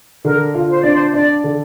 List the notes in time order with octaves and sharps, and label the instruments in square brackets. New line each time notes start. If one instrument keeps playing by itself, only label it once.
[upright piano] D3 [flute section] A#4
[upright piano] F4
[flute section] C5
[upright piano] D4 [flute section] D5
[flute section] C5
[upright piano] D4 [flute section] D5
[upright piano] D3